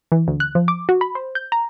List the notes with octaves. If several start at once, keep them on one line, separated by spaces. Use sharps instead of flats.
E3
D2
F#6
F3
D6
F#4
B5
C5
G6
A#5